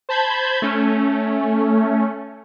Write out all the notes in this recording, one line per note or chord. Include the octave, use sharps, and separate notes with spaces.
C5 A5 B5 G6 G#6
A3 C#4